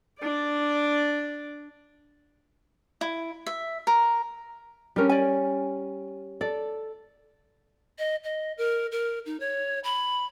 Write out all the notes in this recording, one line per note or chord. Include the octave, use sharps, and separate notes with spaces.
D4 D5
E4
E5
A#4
G3 C#4 D4 A#4
D5 G#5
A4 D5
D#5
D#5
A#4
A#4
D#4
C#5
B5